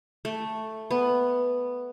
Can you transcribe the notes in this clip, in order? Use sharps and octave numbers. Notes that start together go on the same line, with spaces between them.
A3
B3